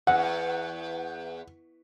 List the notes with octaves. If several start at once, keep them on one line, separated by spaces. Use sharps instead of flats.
E2 F#5